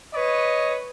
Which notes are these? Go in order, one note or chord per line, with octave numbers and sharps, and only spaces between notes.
B4 C#5 D#5